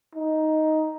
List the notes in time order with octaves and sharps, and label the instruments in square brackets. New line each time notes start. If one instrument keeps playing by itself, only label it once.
[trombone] D#4